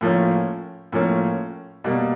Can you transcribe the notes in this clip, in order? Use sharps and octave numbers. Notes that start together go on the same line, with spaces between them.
A2 F3 A#3 C#4
A2 F3 A#3 C#4
B2 G3 A#3